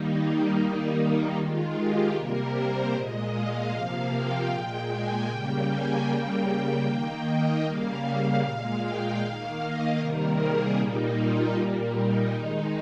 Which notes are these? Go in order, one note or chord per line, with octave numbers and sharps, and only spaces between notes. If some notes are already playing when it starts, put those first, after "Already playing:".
Already playing: D#3 G3 A#3 D#4
D#3 G3 A#3
D#3 G#3 F4
G4
C3 G3 A#3 A#4
C5
A#2 G#3 D#5
F5
C3 F3 A#3
G5
A#2 G#3
G#5
C#3 G3 A#3 G5
G#5
C#3 G3 A#3 G5
D#3 A#3 G5
D#5
C#3 G3 A#3 F5
A#2 G#3
G5
D#3 A#3 F5
D#5
C3 D#3 G3 A#3 A#4
G#4
A#2 G3 A#3 D#4
F4
A#2 G3 A#3
D#4
D#3 G#3 D#4